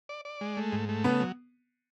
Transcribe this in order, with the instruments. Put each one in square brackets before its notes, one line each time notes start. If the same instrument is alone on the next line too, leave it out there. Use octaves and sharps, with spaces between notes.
[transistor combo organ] D5
D5
G#3
A3
G#2
A3
[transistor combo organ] C#3 [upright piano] B3
[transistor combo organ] F#3